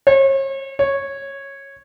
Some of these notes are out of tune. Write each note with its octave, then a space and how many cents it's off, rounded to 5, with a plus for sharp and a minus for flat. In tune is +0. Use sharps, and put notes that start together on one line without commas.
C#5 -40
C#5 -10